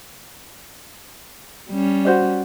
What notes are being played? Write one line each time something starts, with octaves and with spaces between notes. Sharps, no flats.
G3 C#4
F#4 C5 D5